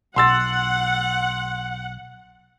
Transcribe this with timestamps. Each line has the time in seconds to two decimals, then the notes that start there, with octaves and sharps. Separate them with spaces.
0.16 B1 F#5 C6 E6 A6